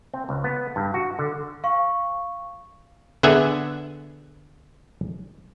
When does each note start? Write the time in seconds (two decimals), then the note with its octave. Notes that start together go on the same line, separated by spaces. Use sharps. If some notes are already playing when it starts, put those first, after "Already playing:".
0.14 C4
0.29 C#2
0.44 B3
0.76 G2
0.94 F#4
1.19 D3
1.64 F5 C#6
3.23 D3 B3 G#4 E5 F#5 G#5